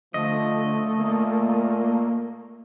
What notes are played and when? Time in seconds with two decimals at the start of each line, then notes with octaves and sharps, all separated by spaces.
0.14 D3 F3 A3 D#5
0.99 A#2 A#3